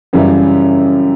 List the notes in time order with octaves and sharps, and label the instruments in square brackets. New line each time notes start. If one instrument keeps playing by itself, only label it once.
[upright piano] F#2 C#3 E3 G3